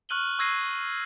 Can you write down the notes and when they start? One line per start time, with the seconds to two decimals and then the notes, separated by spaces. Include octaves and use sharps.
0.09 C#6 F6 F#6 D#7 F#7 G7
0.39 C#6 E6 G#6 A#6 C7 D#7